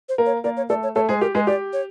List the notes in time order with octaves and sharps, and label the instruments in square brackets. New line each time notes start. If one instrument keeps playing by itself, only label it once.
[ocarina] C5
[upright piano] A#3 A#4
[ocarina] C#5
[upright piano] A#3 A#4 [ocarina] D5
[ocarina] C#5
[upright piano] A3 A4 [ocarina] D5
[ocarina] C#5
[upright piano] A3 A4 [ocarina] C#5
[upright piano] G#3 G#4 [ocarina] C5
[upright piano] G4 [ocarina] A#4
[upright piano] G#3 G#4 [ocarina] B4
[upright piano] G4 [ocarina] D5
[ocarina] C#5